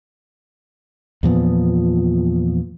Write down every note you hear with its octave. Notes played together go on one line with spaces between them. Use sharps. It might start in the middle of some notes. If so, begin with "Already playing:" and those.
E2 A#2 F3 B3